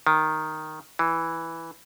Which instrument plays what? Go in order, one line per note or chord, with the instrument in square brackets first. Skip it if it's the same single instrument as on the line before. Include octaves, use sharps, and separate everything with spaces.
[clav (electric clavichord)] D#3
E3